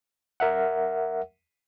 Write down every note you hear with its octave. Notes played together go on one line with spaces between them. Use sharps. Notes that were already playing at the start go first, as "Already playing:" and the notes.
A#4 E5 F#5